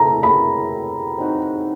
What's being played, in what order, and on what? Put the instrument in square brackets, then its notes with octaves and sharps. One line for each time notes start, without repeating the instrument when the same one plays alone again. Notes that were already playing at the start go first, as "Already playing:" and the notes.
Already playing: [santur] E4 A4 [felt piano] A#5
[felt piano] B5
[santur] C4 D#4 F#4